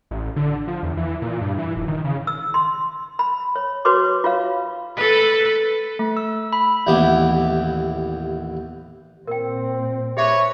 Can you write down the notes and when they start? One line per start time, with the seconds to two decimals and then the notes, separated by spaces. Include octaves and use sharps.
0.11 A1
0.36 D3
0.67 F3
0.83 E2
0.97 E3
1.22 A#2
1.41 G2
1.58 E3
1.76 D#1
1.88 D#3
2.04 C#3
2.27 E6
2.54 C6
3.19 B5
3.56 C#5
3.85 F#4 B4 C#5 C6 D6
4.24 F4 C#5 F5
4.96 A4 B4
5.99 A3
6.17 E6
6.53 B5
6.87 A1 D#2 E3 B3 G4 D6
9.27 A#2 C4 A#4 G5
10.17 G4 G#4 B4 C#5 E5